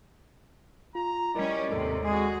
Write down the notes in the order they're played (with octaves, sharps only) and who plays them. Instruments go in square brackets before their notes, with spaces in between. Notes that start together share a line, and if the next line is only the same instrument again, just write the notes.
[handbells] F4 [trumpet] A#5
[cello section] G3 C#4 [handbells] E4 A#4 D#5 [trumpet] D5
[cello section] D#2 G#2 C3 [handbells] A4
[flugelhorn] G#3 [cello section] F#4 G#4